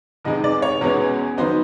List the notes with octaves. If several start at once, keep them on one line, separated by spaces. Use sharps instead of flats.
E2 C3 D#3 G#3 D#5
D5
C#5
E2 B2 G#3 C#4
D#3 F#3 B3 D#4 C5